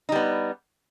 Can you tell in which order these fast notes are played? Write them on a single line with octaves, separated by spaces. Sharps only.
D#4 G3 B3